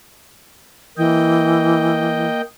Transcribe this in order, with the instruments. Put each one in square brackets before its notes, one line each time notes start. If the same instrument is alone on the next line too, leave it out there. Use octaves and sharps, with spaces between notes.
[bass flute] E3 [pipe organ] A#3 D#5 G5